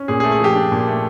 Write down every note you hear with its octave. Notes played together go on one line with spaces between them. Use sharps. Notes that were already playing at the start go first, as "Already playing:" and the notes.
Already playing: C#4
A#2 G#4
G#4
A3
G#4
F3 G4
D4
A#2
A3